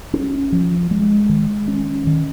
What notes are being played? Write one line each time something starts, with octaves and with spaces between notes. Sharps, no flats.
C#4
F3
G#3
D#3
C#4
D#3